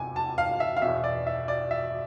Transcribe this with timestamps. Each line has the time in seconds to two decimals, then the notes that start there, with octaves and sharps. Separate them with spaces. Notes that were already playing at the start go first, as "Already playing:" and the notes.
Already playing: F1 E2 C3 G#5
0.16 A5
0.38 F5
0.60 E5
0.77 F5
0.82 E2 B2 E5
1.04 D5
1.27 E5
1.48 D5
1.71 E5